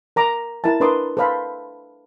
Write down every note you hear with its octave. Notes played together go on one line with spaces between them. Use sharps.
A#4 A#5 D6
E4 A#4 E5 A5
D4 A#4 B4 C6 D6 D#6
A4 B4 C5 F5 B5